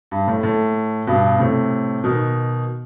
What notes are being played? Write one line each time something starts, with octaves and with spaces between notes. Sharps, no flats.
G2
A2
A2
G2 B2
A2 C3
B2 D#3